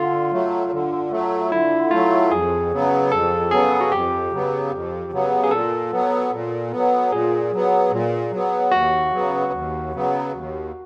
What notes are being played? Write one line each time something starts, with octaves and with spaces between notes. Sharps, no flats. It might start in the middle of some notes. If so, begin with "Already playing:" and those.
Already playing: D3 F4
F#3 A3
D3
F#3 A3
D3 E4
F#3 A3 F4
F2 G#4
C#3 F#3 B3
F2 A4
C#3 F#3 B3 G#4
F#4
F2 G4
C#3 F#3 B3
F2
C#3 F#3 B3
G#4
A#2 A4
F#3 B3
A#2
F#3 B3
A#2 G#4
F#3 B3
A#2
F#3 B3
D#2 F#4
C#3 F#3 B3
D#2
C#3 F#3 B3
D#2